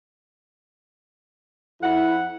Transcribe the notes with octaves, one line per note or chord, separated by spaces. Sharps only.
F2 E4 F#5